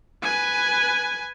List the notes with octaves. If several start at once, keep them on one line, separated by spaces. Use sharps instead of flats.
B4 G#5